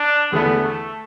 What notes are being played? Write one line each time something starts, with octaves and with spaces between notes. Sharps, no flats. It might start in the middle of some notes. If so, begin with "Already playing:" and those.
Already playing: D4
E2 D3 A3 B3 E4 A4
A3